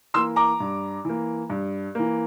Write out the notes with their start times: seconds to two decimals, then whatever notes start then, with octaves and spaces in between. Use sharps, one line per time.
0.14 E3 A#3 C6 E6
0.36 A#5 D6
0.60 G2
1.05 E3 A#3
1.50 G2
1.95 E3 A#3